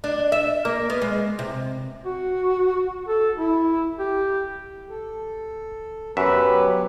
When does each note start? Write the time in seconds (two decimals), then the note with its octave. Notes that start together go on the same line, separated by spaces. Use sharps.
0.04 D4
0.32 E5
0.65 A#3
0.90 B3
1.02 G#3
1.39 C3
2.05 F#4
3.08 A4
3.37 E4
3.99 G4
4.90 A4
6.17 F#2 F#3 B3 G4 B4 E5